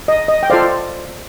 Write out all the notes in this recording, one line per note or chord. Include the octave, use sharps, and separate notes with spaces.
D#5
D#5
G5
F4 A4 C5 D5 F5